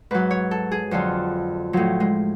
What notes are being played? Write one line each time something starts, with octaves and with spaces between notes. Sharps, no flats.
G#2 F#3 B4
C#5
A4
G#4
F2 D3 F#3 F4
A2 F3 F#3
G#3